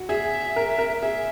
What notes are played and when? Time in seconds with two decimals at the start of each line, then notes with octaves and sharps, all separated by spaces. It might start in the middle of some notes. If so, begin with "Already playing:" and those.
Already playing: F#4
0.09 G#4 E5
0.56 A#4
0.78 A#4
1.02 G#4 E5